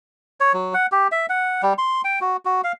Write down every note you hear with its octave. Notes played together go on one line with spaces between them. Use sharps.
C#5
F#3
F#5
G4
E5
F#5
G3
C6
G5
F#4
F#4
F5